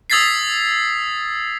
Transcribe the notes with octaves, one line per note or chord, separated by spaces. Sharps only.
D#6 E6 G#6 A6 B6 C7